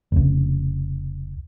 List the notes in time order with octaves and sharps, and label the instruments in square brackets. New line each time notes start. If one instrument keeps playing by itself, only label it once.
[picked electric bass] F1 C#2